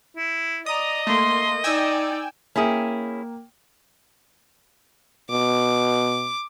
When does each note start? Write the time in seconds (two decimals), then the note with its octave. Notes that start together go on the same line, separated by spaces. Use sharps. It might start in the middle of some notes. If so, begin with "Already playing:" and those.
0.17 E4
0.66 D5 D#5 A#5 D#6
1.07 A3 A#3 C6
1.64 D#4 D5 G5 G#5 E6
2.56 A#3 C#4 E4 G#4 G5
5.30 B2 D6